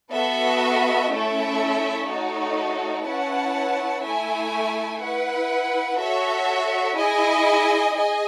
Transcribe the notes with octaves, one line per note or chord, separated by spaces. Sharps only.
B3 F#4 A4 E5
A3 C#4 E4 A4 E5
A3 D#4 F#4 A4 C#5
C#4 E4 B4 F#5 A5
A3 E4 A4 E5 G#5
E4 B4 F#5
F#4 A4 C#5 E5
E4 G#4 D#5 G#5
G#4 D#5 G#5